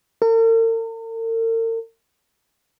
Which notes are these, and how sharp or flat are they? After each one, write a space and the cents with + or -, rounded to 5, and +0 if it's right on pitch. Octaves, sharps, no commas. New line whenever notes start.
A#4 -45